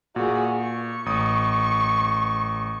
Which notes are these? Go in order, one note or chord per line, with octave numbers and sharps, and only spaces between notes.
A#2 F#4 G#4
C#6
A1 D#6